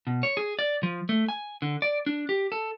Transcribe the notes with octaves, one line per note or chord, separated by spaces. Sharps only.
B2
C#5
G#4
D5
F3
A3
G#5
D3
D5
D4
G4
A4